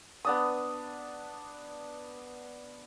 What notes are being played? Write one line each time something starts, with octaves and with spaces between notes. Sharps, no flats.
B3 D4 D#6